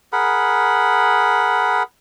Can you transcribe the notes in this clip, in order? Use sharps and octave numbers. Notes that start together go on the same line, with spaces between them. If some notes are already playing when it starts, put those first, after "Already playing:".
G#4 A#4 F#5 B5